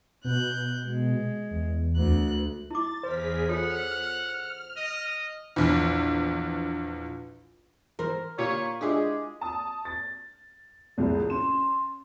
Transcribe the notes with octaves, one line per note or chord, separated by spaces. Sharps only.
B2 F#6 G6
G#3
E2
D2 F#6
E4 D6 A6
E2 G#4 A#4 C5 B6
F4 A4 C#5 F#5 F6
D#5
A#1 E2
E3 A#4 C5
A#2 G4 C#5
G#3 D4 E4 F4 G4 G#4
A5 D#6
A6
C2 F2 A2 G#4
C#4 C6 E7